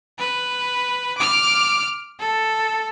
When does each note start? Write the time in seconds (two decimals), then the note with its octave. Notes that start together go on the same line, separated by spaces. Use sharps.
0.19 B4
1.18 D6 F6
2.20 A4